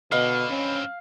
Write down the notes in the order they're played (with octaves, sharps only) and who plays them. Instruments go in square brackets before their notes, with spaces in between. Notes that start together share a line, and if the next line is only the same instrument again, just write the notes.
[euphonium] B2 [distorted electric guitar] D3 [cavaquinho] B4 D#5 C#6 [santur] F5
[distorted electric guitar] G2 C4 [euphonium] C#4